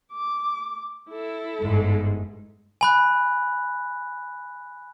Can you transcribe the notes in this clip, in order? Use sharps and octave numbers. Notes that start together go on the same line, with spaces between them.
D6
E4 A4
G1 G#2
G#5 B5 F#6